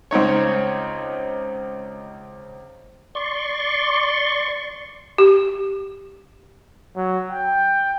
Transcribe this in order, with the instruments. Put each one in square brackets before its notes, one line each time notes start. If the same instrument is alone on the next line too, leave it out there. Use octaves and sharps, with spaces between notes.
[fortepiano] C#2 C4 D#4 C#5
[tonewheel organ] D5 C6 C#6
[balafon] G4
[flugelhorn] F#3
G5